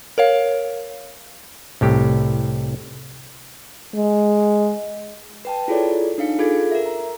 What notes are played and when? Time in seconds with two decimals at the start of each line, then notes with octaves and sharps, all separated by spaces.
0.18 A#4 C#5 F5
1.81 C2 A2 G4
3.95 G#3
5.45 B4 G5 A5
5.68 E4 F4 G#4 A4 C#5 D5
6.18 D4 D#4 F5 C#7
6.39 F4 G#4 A4 F5 G#6
6.71 A#4 E5
6.86 A#5